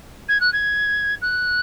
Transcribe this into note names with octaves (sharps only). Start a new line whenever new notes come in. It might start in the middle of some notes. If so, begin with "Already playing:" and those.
G#6
F#6
G#6
F#6